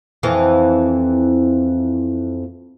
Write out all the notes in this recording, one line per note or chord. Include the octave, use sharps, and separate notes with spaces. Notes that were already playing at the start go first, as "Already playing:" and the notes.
F2 E3